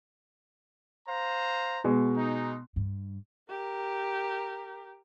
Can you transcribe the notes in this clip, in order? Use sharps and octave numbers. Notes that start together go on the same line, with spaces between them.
C5 F5 A#5
B2 G#3
D#4
G2
G4 A#4